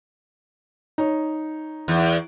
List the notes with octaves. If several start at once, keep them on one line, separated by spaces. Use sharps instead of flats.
D#4 C#5
E2